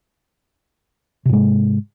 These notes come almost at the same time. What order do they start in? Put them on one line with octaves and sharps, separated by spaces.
C3 G#2 G#3